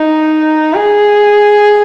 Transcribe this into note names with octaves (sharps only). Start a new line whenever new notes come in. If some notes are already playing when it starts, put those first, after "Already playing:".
Already playing: D#4
G#4